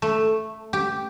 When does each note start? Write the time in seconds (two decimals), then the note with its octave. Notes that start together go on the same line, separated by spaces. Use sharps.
0.02 A3
0.73 G4